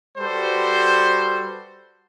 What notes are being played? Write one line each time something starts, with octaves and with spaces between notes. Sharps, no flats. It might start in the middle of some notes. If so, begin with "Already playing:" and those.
G3 F#4 A4 B4 C5